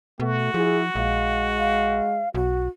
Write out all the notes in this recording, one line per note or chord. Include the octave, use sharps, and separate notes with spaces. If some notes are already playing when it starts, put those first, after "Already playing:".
B2 A3 F#4
F3 E4 G#4
A#1 G#3 F5
F5
B1 F#4